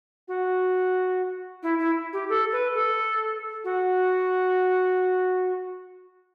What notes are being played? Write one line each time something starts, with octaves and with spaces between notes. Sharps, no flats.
F#4
E4
E4
G4
A4
B4
A4
F#4